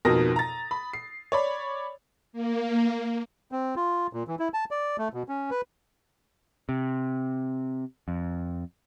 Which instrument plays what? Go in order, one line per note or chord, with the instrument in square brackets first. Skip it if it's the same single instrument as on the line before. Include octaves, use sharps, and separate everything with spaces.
[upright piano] F2 G#2 B2 A#4 D#6 A#6
A#5 A6
B5
C7
C#5 D5 B5
[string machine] A#3
[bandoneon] C4
F4
A#2
E3
E4
A5
D5
A3
B2
C#4
B4
[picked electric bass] C3
F2